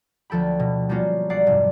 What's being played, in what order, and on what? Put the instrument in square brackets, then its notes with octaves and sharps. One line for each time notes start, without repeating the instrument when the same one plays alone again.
[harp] D2 F3 A4 G5 B5
B2
G3 A#3 B3 C#4 F4 F#4
B1 D5 F#5 C7
F1 G#2